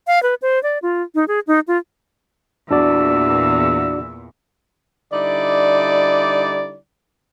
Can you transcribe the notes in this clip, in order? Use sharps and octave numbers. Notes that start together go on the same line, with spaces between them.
F5
B4
C5
D5
F4
D#4
G#4
D#4
F4
E2 A#2 D4 F#4 D5 E6
D3 G3 D#4 E4 D5